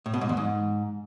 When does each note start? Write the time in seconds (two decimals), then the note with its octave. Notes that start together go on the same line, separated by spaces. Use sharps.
0.06 A2
0.14 B2
0.21 G#2
0.29 E2
0.37 G#2